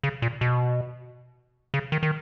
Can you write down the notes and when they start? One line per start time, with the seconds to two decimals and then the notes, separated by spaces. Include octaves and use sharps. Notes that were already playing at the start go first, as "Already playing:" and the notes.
0.03 C#3
0.22 A#2
0.41 B2
1.74 C#3
1.92 D#3
2.03 D#3